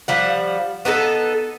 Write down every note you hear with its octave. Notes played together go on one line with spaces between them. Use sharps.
F3 G3 F#5
B3 D4 D#4 A4